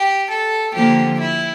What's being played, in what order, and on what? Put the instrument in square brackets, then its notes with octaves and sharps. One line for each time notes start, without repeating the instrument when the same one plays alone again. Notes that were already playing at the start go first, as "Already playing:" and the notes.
Already playing: [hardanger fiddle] G4
A4
[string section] D3 F3 A#3 [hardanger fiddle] G4
[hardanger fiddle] E4